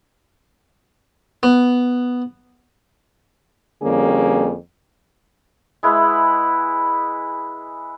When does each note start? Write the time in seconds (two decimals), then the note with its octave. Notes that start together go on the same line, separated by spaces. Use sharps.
1.43 B3
3.82 F2 D3 G3 A#3 C#4 G#4
5.83 G#3 E4 B4 F#5